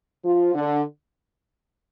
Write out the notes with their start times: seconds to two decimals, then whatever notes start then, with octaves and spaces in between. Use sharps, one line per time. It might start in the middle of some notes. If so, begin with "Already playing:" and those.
0.24 F3 F4
0.55 D3 D4